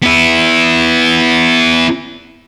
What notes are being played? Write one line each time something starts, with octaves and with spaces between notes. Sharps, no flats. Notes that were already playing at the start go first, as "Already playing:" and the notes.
B3 E4